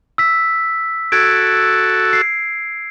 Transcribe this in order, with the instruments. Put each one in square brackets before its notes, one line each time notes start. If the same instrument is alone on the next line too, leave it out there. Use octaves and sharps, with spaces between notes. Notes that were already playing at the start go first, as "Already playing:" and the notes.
[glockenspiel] E6 B6
[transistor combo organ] F#4 A4 [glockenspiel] G#6 D7
[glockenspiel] C7